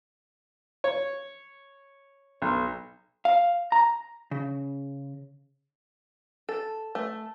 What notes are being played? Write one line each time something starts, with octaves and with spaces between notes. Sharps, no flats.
C#5
B1
F5
A#5
C#3
A4
A3